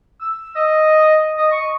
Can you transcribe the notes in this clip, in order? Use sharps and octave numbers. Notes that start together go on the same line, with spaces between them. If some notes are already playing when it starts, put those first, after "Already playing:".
E6
D#5
D#5
C#6